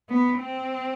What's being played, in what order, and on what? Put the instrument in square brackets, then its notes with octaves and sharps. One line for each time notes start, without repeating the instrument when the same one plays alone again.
[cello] B3
C4